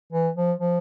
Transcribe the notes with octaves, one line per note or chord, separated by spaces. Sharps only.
E3
F3
F3